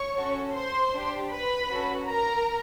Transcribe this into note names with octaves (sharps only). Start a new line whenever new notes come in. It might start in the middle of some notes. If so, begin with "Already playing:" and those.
Already playing: C#5 C#6
C#4 F#4 A4
C5 C6
D4 G4
B4 B5
C#4 F#4 A4
A#4 A#5